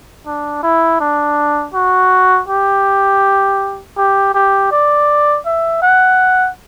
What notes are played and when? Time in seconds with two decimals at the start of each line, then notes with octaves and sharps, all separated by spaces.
0.27 D4
0.63 E4
1.00 D4
1.74 F#4
2.49 G4
3.97 G4
4.34 G4
4.71 D5
5.46 E5
5.83 F#5